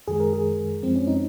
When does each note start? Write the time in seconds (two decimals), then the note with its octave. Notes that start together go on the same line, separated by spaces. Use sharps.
0.08 F#2 D#3 G#3 G#4
0.20 A#4
0.33 G#4
0.83 F#2 F3 G#3 C4
0.96 C#4
1.07 D#4